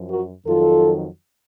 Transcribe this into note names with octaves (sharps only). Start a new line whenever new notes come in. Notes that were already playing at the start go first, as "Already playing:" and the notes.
Already playing: F#2 F3
F#4 A#4
F2 D#3 F#3 F4 A4